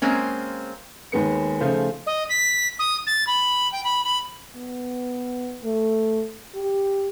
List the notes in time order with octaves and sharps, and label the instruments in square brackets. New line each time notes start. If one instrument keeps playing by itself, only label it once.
[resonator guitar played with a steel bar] G#3 A#3 C4 C#4
[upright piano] D#2 D#3 G#3 B3 C#7
C#3 F3 A3 D#4 F4 C5
[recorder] D#5
B6
D#6
A6
B5
G5
B5
B5
[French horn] B3
A3
G4